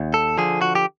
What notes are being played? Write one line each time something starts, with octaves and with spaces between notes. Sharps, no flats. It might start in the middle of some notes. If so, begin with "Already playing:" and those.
Already playing: D#2
A4
D3 F3 G#4
F#4
G4